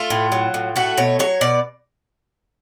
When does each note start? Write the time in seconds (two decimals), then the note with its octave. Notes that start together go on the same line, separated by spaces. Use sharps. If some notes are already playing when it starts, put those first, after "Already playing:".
Already playing: A3 F4
0.10 A2
0.32 F#3
0.54 A2
0.76 A3 F#4
0.98 B2 C#5
1.19 F#3 C#5
1.41 B2 D5